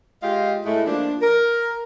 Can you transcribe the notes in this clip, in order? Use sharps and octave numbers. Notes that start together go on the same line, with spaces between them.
G#3 F4 G4 D#5 F5
A2 G#3 A3 E4
F3 A#3 D4
A#4